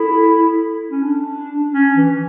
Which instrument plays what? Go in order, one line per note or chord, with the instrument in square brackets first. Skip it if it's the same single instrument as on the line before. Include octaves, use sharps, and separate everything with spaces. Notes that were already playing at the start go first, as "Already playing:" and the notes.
Already playing: [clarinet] E4 [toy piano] A4
[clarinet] C#4
D4
C#4
E3